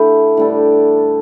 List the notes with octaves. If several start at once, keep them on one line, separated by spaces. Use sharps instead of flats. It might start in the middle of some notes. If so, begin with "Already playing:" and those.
Already playing: D3 A3 E4 G4
A2 G3 D4 A4